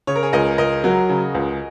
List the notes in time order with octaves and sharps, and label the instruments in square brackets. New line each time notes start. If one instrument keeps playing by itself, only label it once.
[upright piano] C#3 [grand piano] C#5
[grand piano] A#4
G#4 C#5
[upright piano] C#2 [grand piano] A#4 D#5
[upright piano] C#2 [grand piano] A#4 D#5
[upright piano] F#3 [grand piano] F#4 A#4
[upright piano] C#3
C#2